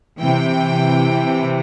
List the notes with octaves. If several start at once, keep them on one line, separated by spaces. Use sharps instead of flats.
C3 E3 G5